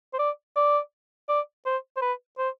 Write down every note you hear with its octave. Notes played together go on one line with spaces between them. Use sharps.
C5
D5
D5
D5
C5
C5
B4
C5